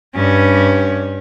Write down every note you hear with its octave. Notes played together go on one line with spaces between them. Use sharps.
G2 C#4